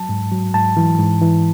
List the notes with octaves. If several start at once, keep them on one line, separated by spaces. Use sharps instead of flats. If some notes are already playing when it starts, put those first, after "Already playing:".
Already playing: F#3 A5
G#2
F#3
G#2 A5
E3
G#2
E3